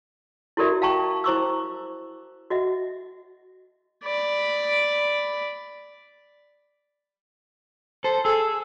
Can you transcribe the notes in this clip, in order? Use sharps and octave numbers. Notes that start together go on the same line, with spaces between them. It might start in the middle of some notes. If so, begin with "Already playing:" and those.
E4 F#4 G4 A#4 D5 E5
F5 G5 A5 A#5 C#6
E4 C5 A#5 C#6 D6 E6
F#4 D#5 E5 F#5
D5 B5
A4 C5
G#4 A4 E6